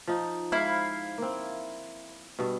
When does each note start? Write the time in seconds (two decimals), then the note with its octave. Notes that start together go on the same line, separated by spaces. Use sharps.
0.07 F3 D#4
0.52 G#2 E4 F5
1.18 A#3 C4
2.39 G2 B2